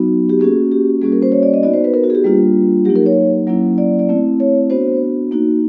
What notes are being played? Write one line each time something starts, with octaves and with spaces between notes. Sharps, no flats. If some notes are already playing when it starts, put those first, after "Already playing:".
Already playing: F#3 B3 D#4 F#4
G4
A#3 C#4 F#4 G#4
G4
G3 A#3 C#4 F#4 G#4
A#4
C5
C#5
D5
D#5
B3 D#4 F#4 D5
C5
B4
A#4
F#4
G#4
G4
G3 A#3 D4 F4
F#3 A#3 D#4 G4
A#4
C#5
F#3 A#3 C#4 E4
D5
D5
A3 C4 E4
C#5
B3 D4 F#4 C5
A#3 D#4 F#4